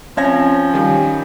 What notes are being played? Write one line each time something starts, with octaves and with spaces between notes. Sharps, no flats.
F3 C4 C#4 G#6 A#6
D#3 G3